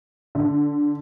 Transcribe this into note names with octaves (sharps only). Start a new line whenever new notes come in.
D3